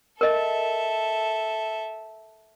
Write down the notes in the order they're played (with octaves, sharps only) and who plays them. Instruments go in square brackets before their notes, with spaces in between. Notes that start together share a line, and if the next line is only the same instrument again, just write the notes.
[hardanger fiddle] A4 E5 [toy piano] A#4 D#5